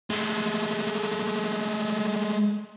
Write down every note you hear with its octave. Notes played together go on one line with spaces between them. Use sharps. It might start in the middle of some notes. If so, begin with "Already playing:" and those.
G#3 A3